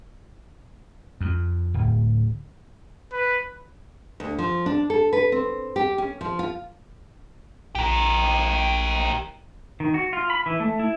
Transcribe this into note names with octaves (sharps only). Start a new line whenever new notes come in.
F2
D1
B4
D2
F3
D4
A4
B4
C4
G4
C#4
F3
F4
A#1 G4 A#4
D#3
F#4
F4
B5
E3
A3
E4